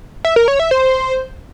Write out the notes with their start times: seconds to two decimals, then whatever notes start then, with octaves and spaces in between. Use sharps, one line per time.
0.25 E5
0.36 A#4
0.48 C#5
0.60 E5
0.71 C5